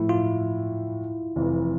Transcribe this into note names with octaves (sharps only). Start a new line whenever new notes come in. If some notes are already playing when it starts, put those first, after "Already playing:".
Already playing: A2 F3 A3 E4
F4
F1 F2 E3